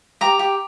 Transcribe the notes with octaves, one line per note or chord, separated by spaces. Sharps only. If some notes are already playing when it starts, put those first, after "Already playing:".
G4 A#5
G4